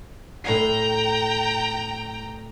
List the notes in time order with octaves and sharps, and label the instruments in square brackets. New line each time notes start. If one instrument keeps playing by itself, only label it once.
[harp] A2 C7 [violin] G5 A#5